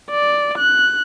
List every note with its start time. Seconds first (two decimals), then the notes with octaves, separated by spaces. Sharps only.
0.11 D5
0.58 F#6